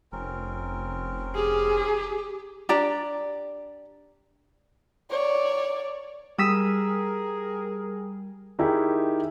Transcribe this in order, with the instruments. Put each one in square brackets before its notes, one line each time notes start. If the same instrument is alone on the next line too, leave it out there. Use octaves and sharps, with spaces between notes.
[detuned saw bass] F1 [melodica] C4 C#4 A#4
[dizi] G4 [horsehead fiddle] G#4
[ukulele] D4 G4 D5 A#5
[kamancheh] C#5 D5
[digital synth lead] G3 [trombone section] G#4 A#4 [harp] D#6 E6 B6
[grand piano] D#3 D#4 E4 G4 G#4